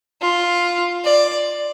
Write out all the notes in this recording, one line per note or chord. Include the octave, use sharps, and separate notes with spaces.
F4
D5